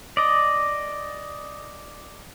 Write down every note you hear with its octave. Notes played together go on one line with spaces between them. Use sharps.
D5 D#5